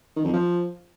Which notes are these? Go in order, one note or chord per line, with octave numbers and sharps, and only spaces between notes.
D#3
F2
F3